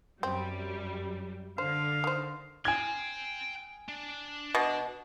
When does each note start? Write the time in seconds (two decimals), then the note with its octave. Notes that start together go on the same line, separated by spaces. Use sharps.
0.23 F#2 G3 C4
1.58 D3 C5 F5
2.04 D#3 C5
2.65 G5 G#5 C6 G#6
3.89 D4
4.55 B2